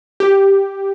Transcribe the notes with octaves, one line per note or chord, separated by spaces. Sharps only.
G4